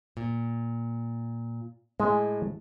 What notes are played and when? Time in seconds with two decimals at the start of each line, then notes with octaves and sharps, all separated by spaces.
0.17 A#2
2.00 A2 G#3